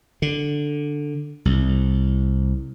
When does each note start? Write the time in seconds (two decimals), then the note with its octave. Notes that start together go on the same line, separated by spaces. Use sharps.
0.22 D3
1.45 C2